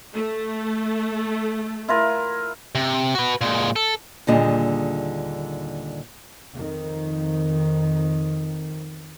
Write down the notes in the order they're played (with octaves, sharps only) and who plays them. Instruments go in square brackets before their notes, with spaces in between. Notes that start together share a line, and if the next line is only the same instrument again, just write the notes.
[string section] A3
[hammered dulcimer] E4 F4 A#4
[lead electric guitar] C3
F#4 B4
A#2 G#3
A4
[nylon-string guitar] D#2 A#2 D3 G3 G#4 D#5
[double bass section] F2 D#3